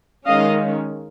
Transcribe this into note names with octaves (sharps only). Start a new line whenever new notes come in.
D#3 G#3 C#4 D#5 F5